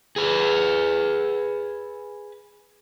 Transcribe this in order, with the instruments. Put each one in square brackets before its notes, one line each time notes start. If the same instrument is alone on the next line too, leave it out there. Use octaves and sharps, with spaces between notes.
[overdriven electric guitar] G#4 B4